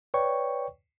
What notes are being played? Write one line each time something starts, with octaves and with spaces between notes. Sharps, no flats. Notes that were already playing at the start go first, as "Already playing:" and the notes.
B4 C#5 D5 G5 C#6